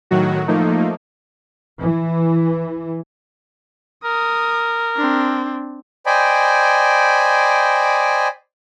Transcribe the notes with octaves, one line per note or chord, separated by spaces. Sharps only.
A2 D#3 F#3 F#4
F3 A3 A#3 D#4
E3
A#4 D#6
C4 D4
C5 D5 D#5 G5 G#5 B5